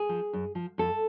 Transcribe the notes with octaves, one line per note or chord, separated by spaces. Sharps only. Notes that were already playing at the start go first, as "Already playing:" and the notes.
Already playing: G#4
F3
F#2
F3
F2 A4